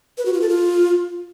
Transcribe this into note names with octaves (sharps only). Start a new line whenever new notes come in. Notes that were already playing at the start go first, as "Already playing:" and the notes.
B4
F#4
F4
A4
F4